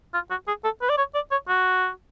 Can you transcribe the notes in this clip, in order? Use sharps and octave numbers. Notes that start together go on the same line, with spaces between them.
F4
F#4
G#4
A4
B4
D5
C#5
D5
C#5
F#4